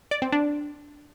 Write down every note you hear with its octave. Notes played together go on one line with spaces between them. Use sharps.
D5
C4
D4